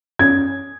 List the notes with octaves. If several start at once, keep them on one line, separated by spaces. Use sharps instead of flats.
C#4 G#6